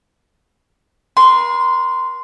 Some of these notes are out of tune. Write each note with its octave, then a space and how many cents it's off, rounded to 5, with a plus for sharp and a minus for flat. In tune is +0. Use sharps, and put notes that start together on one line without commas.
A#4 +45 C6 -10